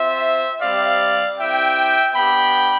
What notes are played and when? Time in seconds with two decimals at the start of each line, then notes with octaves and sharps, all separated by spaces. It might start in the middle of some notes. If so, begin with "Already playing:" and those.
Already playing: C4 F4 C5 E5
0.61 G3 C4 G4 D5 F5
1.38 C4 E4 G4 E5 G5
2.15 B3 D4 G4 G5 B5